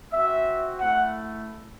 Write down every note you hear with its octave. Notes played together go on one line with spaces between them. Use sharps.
C4 F#4 E5
A3 E4 F#5